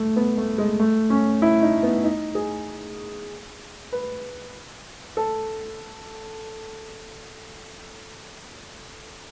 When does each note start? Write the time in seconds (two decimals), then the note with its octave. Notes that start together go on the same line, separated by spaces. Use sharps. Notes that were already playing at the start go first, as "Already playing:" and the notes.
Already playing: A3
0.16 B3
0.38 A3
0.58 G#3
0.80 A3
1.10 C#4
1.42 E4
1.62 D#4
1.83 B3
2.04 D#4
2.35 G#4
3.93 B4
5.17 A4